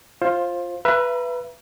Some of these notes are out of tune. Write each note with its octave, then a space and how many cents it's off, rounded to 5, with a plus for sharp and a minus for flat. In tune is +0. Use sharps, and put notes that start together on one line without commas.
F4 +0 C5 +20
B4 +0 E5 +35 A#5 +30